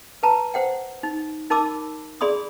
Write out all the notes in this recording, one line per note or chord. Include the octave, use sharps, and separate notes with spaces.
B4 A5 A#5
C5 F#5 G5
D#4
D#4 A#4 A5 B5 D6 E6
G#4 D5 B5 C6 D#6